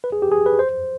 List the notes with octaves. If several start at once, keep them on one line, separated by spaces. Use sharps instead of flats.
B4
G#4
G4
G#4
B4
C5